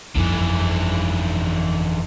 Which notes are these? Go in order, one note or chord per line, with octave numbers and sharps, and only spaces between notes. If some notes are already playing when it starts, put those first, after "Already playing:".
G1 F2 D3 E3